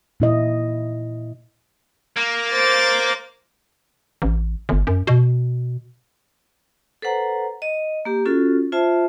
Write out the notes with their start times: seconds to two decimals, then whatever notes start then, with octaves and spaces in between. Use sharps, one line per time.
0.20 A#2 E4 D#5
2.17 A#3
2.50 C5 D6 A6
4.22 A1
4.69 G1
4.87 F#2
5.07 B2
7.02 A4 B4 C5 F#5 A#5
7.62 D#5
8.05 A#3 G4
8.25 C#4 F4 F#4 A4
8.72 F4 C5 E5 A5